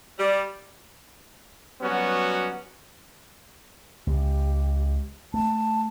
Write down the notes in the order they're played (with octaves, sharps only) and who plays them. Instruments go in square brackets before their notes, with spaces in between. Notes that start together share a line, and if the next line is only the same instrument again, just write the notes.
[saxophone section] G3
[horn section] F#3 G3 B3 C#4 F#4
[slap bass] C#2 [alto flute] G4
[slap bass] A3 [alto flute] A5